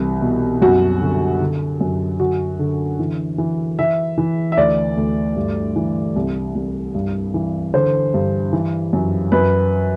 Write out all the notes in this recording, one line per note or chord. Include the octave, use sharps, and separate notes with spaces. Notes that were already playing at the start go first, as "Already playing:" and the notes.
Already playing: C2 E3
B2
F#2 F#4
D3
D3
F#2
D3 F#4
D3
E3
E3
E3 E5
E3
E5
D2 D5
D2
G2
E3
C2
C2
G2
E3
D3 C5
G2
E3
F#2
F#2 B4